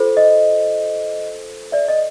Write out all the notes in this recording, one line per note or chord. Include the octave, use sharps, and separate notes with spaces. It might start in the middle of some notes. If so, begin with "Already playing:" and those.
Already playing: F4 A4 C5
D#5
D5 E5
D#5